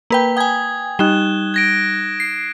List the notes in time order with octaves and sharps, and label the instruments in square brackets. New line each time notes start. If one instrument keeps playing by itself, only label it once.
[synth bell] A#3 B4 G5
[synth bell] G5 G#5 [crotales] D#6 G#6
[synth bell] G3 D#4 [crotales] F#6 E7 G7
[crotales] G#6 A#6 D7
[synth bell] C7